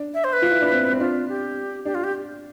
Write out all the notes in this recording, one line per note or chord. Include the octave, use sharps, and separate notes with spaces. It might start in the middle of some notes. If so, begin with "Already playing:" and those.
Already playing: D4
E5
C5
B4
F4
E4
D4
C4
C4
D4 F4
G4
D4 G4
F4
G4